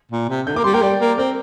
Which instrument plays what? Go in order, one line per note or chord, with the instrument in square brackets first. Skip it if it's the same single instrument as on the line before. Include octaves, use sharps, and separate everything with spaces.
[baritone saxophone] A#2
C3
[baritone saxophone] D3 [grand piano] G6
[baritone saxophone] A#3 [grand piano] D6
[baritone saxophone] G3 [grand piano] C6
[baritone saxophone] A#3 [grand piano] G5
[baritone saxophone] G3 [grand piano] D5
[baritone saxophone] A#3
[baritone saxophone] C4 [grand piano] A#4